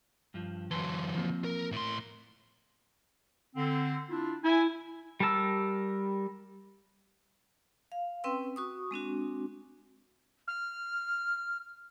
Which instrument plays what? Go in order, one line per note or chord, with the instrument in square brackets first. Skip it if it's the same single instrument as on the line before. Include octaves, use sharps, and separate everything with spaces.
[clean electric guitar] G2 F3
[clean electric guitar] F#2 A5 C6 [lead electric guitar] E3 F#3
[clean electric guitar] F3 A#3 C4
[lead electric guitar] A#4
A2 C6
[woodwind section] D3 C4
D4 E4 F4
[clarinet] E4 [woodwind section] E5 G#5
[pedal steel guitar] G3 G4 A#4 A5 E6
[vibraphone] F5
C4 C#4 B4 G5 C6 E6
F#4 C#6 D#6
G#3 C4 D4 F#4
[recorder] F6